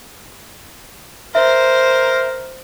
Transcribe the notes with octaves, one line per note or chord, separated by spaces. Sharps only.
A#4 C5 E5